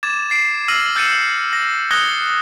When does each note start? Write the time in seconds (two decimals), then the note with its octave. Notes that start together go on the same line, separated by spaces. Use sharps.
0.03 D6 G#6 A6 E7
0.30 A6 C7 D7
0.68 E6 F6 A#6 C7 D#7 F#7
0.96 E6 G6 A6 C#7 D#7 E7
1.53 A#6
1.91 D#6 F#6 G#6 A#6 C#7 G7